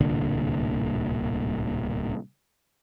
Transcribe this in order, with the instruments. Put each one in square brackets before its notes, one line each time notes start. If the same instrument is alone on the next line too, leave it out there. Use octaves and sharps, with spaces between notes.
[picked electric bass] D1 C2 A#2 D3